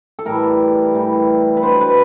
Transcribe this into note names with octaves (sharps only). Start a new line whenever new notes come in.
A4
A2 E3 G3 A#4
A2 E3 G3
B4
B2 F#3 B3 D4 C5
B4